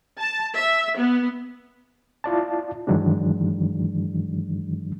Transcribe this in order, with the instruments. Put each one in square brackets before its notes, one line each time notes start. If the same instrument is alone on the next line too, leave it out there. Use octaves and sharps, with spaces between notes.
[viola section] A5
E5
B3
[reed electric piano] E4 F4 D5 A5
G2 D#3 E3 F#3 G#3 D4